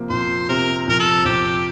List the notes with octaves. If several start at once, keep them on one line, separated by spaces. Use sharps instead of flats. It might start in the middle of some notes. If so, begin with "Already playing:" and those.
Already playing: C3 F3 A#3
F2 C5
C3 A#4
F2 A#4
A4
F2 G4